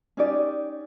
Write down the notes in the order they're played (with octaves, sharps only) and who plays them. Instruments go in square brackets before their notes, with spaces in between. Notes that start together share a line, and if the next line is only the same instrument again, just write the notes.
[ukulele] C#4 D#4 G4 D5